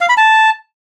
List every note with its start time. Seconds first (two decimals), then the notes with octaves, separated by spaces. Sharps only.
0.01 F5
0.09 B5
0.17 A5